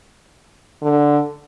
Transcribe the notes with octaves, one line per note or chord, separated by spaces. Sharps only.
D3